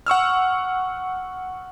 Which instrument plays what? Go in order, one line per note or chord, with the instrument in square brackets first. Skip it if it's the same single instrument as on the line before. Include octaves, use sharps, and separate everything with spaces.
[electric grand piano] F#5 C#6 E6 F6